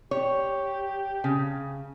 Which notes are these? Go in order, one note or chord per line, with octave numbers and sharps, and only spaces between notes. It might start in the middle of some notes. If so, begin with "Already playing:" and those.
G4 C#5
C#3